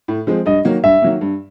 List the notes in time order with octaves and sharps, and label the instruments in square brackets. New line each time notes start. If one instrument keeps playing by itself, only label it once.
[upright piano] A2
F3 G#3 C4
[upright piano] G2 [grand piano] D#5
[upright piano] D#3 F#3 A#3
[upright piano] G2 [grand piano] E5
[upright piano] D#3 F#3 A#3
G2